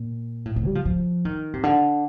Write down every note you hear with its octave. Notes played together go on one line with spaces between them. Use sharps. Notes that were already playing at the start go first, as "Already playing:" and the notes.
Already playing: A#2
A2
A2
G3
F3
F3
D#3
C3
D3